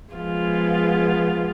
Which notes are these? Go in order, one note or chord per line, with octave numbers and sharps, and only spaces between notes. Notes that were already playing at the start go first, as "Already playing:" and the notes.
F3 G#3 B3 F4